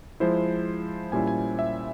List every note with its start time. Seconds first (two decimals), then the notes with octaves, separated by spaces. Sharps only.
0.20 F3 G#3 E4 C5
1.12 A#2 G3 C#4 E4 G#5
1.27 G#5
1.59 E5